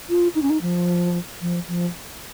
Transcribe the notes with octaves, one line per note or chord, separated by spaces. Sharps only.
F4
D#4
C#4
D#4
F3
F3
F3